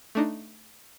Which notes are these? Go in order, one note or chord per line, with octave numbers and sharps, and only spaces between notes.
A3 D4 D#4